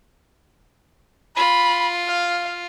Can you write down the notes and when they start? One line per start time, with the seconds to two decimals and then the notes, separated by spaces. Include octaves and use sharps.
1.37 F4 B5
2.06 F5